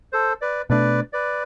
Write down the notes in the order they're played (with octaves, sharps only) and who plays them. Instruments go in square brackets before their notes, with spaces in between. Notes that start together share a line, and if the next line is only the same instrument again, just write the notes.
[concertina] A4 C5
B4 D5
[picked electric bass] B2 A3 D4 [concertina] B4 D5
[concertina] B4 D5